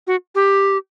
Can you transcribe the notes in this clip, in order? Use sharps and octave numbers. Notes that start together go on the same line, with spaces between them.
F#4
G4